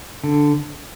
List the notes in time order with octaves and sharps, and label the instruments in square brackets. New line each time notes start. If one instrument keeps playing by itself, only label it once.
[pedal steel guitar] D3